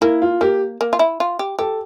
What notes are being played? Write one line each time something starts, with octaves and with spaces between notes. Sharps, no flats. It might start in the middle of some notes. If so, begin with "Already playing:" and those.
A#3 E4
F4
A#3 G4
A#3
F4
E4
F4
G4
G4 A4